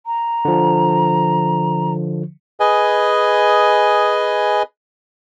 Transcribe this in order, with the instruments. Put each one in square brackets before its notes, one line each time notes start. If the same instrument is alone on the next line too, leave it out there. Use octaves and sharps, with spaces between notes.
[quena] A#5
[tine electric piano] D3 F3
[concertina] G#4 B4 D#5 G#5